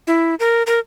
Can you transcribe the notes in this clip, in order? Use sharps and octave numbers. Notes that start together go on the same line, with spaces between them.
E4
A#4
A#4